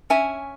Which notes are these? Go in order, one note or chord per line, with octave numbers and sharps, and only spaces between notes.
C#4 E5 G#5